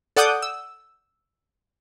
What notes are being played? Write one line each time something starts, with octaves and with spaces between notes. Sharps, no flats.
A4 D5 F#5 D6 D#6 G6
E6